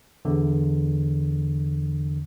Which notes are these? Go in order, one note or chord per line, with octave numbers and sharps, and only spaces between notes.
E2 D3